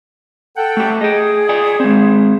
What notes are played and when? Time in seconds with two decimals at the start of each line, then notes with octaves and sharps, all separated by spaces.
0.55 A4 F#5 G5
0.77 A3 G4
1.01 G#4 D#5 G5
1.49 D5 G5 G#5
1.80 G#3 C4